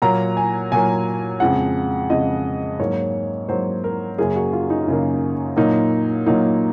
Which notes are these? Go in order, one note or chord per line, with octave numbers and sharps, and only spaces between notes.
A#2 F#3 A#3 A#5
G#5
A#2 F#3 A#3 G#5
F2 C#3 G#3 F#5
F2 C#3 G#3 D#5
G#2 F#3 A#3 C#5
G#2 F#3 A#3 C5
A#4
F#2 C#3 F#3 A#3 G#4
F#4
F4
D#4
F#2 C#3 F#3 A#3
A#2 F#3 A#3 D#4
A#2 F#3 A#3 D#4